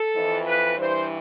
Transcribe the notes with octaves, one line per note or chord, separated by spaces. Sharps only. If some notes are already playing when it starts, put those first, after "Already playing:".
Already playing: A4
F2 E3
B4
G2 E3 C5